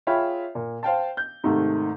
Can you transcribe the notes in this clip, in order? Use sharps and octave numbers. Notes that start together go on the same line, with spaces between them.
F4 G#4 C#5 E5 G5 B5
A#2
C5 F5 G5 A5
G6
G#2 C3 D#3 A3